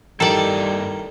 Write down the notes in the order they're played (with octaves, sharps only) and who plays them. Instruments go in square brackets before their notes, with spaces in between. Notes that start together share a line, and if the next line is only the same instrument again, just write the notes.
[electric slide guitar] G2 E4 D#5 [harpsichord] D#3 [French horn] G3 [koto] A4 D5